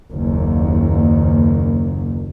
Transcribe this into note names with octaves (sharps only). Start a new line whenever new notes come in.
F#1 D#2